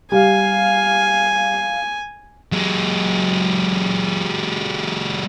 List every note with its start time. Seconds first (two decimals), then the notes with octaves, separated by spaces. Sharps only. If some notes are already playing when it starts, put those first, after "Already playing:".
0.12 G3 F5 G#5
2.52 F#3 G#3